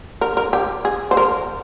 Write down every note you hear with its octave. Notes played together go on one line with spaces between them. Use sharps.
A#4
A#4
G4
G#4
C5
A#4